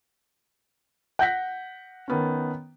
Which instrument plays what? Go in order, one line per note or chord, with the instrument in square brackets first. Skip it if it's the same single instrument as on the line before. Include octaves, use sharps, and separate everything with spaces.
[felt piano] F#5 G6 A#6 B6
D#3 B3 C#4